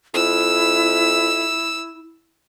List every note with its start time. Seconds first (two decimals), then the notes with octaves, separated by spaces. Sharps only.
0.14 F2 E4 E6